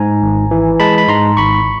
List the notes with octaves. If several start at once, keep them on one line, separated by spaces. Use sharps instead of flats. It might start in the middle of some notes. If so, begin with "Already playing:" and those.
Already playing: G#2 G#5 A#5
G#1
E3
G#3 A5 B5
B5
G#2 A#5 C6
G#1 B5 C#6